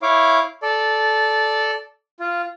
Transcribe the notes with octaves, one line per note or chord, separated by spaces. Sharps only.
E4 C#5 F5 D6
A4 D5
F4